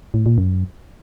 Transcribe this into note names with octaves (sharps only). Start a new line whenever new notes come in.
A2
A#2
F#2